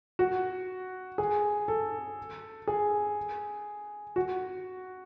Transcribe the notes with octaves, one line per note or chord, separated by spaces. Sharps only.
F#4
G#4
A4
G#4
F#4